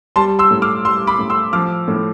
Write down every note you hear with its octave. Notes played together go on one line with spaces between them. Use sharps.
G3 A5 C6
C6 E6
A2
D6 F6
G3 C6 E6
B5 D6
A2
C6 E6
F3 D6 F6
A2